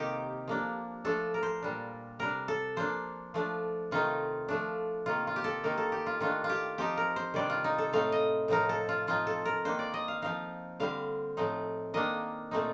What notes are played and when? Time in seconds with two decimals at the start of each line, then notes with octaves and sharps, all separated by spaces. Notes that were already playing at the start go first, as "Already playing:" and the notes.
Already playing: C3 D#3 A#3 D#4 G4
0.48 F3 A#3 D4
1.05 F3 A3 D4 A4
1.34 A#4
1.43 C5
1.62 A#2 G3 D4
2.19 C3 G3 D4 A#4
2.48 A4
2.76 F3 A#3 D4 C5
3.34 F3 A3 D4
3.91 C3 D#3 A3 D#4 F4
4.48 F3 A3 D4
5.06 C3 D#3 A#3 F4
5.27 F4
5.36 G4
5.44 A4
5.63 D#3 A#3 D#4 A#4
5.78 A4
5.92 G4
6.06 F4
6.20 D#3 A3 D4 F4
6.44 F4
6.49 G4
6.78 F3 C4 D#4 G4
6.97 A#4
7.16 C5
7.34 C3 D#3 G3 D4 D5
7.50 F4
7.64 D#4
7.78 A4
7.93 A2 A3 C4 D#4 F5
8.12 D#5
8.48 A2 F3 C4 D#4 A#4
8.69 A4
8.89 F4
9.07 F3 C4 D#4 F4
9.27 A4
9.45 A#4
9.65 D#3 A#3 D4 C5
9.79 D5
9.94 D#5
10.08 F5
10.22 F3 C4 D#4 F5
10.80 D3 G3 C4 F5
11.37 A2 F3 C4 D#4
11.94 D#3 A#3 D4 D#5
12.51 A#2 A3 C4 D#4